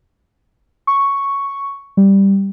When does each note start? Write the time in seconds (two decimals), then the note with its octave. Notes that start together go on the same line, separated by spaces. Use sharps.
0.87 C#6
1.97 G3